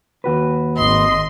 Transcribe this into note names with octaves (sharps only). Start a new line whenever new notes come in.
D#2 F#4 B4
G#1 D#5 C6